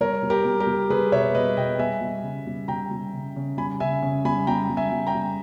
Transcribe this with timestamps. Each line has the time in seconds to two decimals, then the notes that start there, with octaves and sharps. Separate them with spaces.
0.01 G3 A#4 C#5
0.23 G3
0.30 G4 A#4
0.45 G3
0.60 G4 A#4
0.67 G3
0.90 G3 G#4 B4
1.12 B2 C#5 E5
1.35 G3 B4 D#5
1.57 B2 D#5 G5
1.79 G3 E5 G#5
2.01 G3
2.23 C#3
2.47 G3
2.68 G3 G5 A#5
2.91 G3
3.13 C#3
3.36 C#3
3.57 G3 G#5 B5
3.80 C#3 E5 G#5
4.02 C#3
4.25 G3 G#5 B5
4.47 G3 G5 A#5
4.70 G3
4.77 E5 G#5
4.92 G3
5.07 G5 A#5
5.15 G3